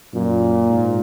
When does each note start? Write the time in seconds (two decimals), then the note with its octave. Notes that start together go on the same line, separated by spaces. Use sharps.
0.14 F#2 A#2
0.67 G#2